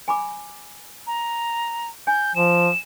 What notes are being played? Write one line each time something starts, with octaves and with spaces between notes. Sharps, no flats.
G#5 B5 D6
A#5
G#5 G6
F3 E7